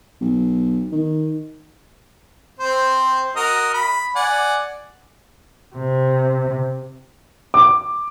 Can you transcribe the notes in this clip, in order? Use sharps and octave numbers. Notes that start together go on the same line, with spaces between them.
B1
D#3
C4 C5
F#4 A#4 D#5
B5
D5 F#5 G#5
C3
D6